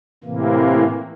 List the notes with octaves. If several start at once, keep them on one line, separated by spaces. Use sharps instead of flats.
A2 C3 E3 A#3